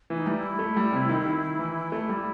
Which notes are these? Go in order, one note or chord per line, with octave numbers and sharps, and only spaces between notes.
E3 D#4
G3
E4
A3
G3
C3
D#3
D#3
E3
A3 E4
G3